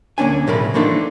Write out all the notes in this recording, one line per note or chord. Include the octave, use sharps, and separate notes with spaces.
D2 A#3 C#4 D4 G#5
B1 A2 C#3 A#4 B5
E3 F3 A3 A#3 D4 D#4